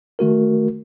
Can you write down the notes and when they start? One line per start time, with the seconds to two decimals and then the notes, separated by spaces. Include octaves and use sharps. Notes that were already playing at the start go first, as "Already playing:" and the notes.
0.19 D#3 A3 F#4 A#4